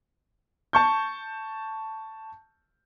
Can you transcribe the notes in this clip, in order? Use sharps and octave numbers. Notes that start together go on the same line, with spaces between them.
A5 C#6 G6